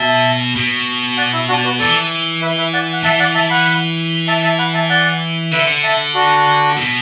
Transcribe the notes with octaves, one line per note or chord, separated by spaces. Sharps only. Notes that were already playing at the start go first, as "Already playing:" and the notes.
Already playing: B2 E5 A5
B2
D5 F#5
E4
D4 F#4
D5
F#4 B4
E3 A4 D5
B4 E5
B4 E5
D5 F#5
F#5
E3 E5 A5
D5 F#5
E5 A5
F#5 B5
E5 A5
E5 A5
F#5 B5
E5 A5
D5 F#5
D3 B4 E5
E5 A5
D4 F#4
B2